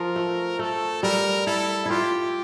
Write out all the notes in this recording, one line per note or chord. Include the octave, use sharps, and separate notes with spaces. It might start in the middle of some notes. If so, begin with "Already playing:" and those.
Already playing: F3 A#4
A3
A3 A4
G3 A#4
E4 A4
E4 F4 G4